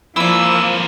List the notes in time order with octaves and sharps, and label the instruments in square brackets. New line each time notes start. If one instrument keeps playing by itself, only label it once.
[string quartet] F3 A#3 [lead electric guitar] C4 B4 [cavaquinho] E4 D5 [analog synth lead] E6